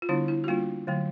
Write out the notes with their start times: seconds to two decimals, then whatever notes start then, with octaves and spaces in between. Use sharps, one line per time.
0.02 F4
0.09 D3 G3 B3 D4 E4
0.28 E4
0.44 F#4
0.48 G3 A#3 D4 F4
0.87 D3 F#3 A3